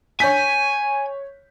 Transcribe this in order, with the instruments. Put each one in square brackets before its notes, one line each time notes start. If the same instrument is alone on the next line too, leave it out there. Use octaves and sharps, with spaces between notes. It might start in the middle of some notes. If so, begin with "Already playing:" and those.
[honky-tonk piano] C#5 G6 B6 [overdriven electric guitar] G#5